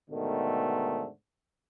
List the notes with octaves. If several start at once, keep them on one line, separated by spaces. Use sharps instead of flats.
G#2 B2 D3 D#3 A3